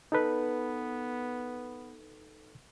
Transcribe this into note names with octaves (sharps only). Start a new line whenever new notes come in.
B3 D#4 A4 B4